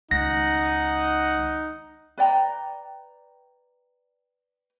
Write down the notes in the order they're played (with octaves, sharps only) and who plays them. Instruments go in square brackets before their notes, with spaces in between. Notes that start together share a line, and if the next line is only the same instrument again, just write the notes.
[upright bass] C#2 D#3 [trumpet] D#4 [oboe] F#5 [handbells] A#6
[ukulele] B4 D5 G5 A#5